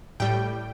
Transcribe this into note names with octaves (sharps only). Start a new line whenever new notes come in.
A2 G3 G5